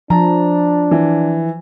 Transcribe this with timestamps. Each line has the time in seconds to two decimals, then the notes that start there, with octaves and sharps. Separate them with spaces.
0.10 F3 D4 A5 A#5
0.91 E3